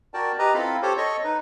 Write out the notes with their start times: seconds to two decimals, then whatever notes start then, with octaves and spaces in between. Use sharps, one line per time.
0.14 F#4 A#4 D5 G5 A5
0.39 G4 B4 D#5 A#5
0.54 C4 E4 F4 A4 F5 B5
0.82 G4 A4 C5 C#5
0.98 A4 C#5 D#5 C#6
1.24 D#4 B4